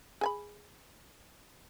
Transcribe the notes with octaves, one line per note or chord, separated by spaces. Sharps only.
G#4 G#5 B5